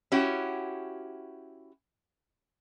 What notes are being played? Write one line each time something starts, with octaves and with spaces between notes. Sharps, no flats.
C#4 E4 F#4 G4